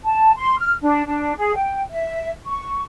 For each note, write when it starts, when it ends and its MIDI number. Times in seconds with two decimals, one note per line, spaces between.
0.03 0.32 81
0.35 0.58 84
0.59 0.75 89
0.81 1.06 62
1.07 1.33 62
1.37 1.54 68
1.56 1.80 79
1.91 2.30 76
2.45 2.82 85